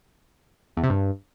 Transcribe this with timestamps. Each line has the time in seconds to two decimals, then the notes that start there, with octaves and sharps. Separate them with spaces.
0.77 E2
0.83 C3
0.90 G2